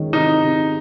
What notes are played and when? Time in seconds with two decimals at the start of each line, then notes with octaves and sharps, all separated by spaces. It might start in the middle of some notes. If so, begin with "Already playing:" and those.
Already playing: D#3 G#3 C#4
0.13 C3 D#4
0.44 C3